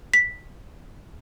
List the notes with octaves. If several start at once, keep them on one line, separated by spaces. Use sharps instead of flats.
B6